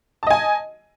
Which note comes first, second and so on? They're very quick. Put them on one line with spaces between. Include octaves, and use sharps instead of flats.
A5 D#5 G#5